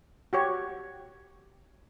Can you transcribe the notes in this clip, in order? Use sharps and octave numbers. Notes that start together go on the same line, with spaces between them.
F#4 G4 C#5